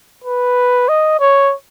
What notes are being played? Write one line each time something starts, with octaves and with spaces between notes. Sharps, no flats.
B4
D#5
C#5